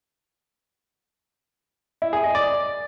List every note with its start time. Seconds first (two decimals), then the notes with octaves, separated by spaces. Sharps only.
2.02 E4
2.13 G#4
2.24 D#5
2.35 D5